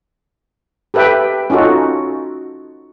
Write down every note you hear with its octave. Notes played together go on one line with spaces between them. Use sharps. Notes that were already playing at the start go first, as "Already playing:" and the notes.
G4 A4 B4 E5 G5
C#4 D#4 F4 F#4 A4